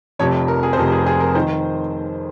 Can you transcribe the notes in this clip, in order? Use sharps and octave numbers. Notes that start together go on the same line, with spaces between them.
F1 F2 C3 C#5
A#4
G#4
C5
F1 F2 C3 A#4
G#4
G#4
A#4
D#3 C5